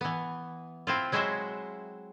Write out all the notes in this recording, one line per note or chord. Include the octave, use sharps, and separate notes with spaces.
E3 B3
C4 E4 F4
F#3 G#3 E4 F#4 C5 E5